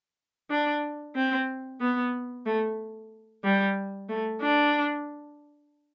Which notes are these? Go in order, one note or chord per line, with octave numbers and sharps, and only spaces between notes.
D4
C4
B3
A3
G3
A3
D4